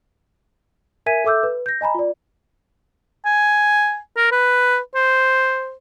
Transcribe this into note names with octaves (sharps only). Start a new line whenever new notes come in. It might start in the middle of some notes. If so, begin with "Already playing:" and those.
A#4 E5 G#5 G#6 B6 D#7
A4 E5 D6 E6 G6
B4
G6 A#6
D#5 G#5 A#5 B5
F4 D5
G#5
A#4
B4
C5